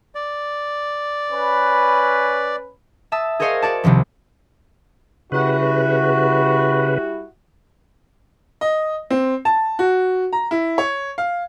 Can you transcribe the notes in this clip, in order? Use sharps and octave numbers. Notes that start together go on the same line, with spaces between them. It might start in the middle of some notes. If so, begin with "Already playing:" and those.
D5
C#4 B4
E5 A5 D#6 E6
G#4 A#4 C5 C#5 D#5 F5
F#4 D5 A5
C2 C3 D#3 F3
C#3 G3 E4 F#4 B4
D#5
C4
A5
F#4
A#5
E4
C#5
F5